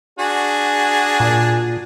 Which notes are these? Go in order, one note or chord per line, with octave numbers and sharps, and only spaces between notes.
D4 F#4 G#4
A#2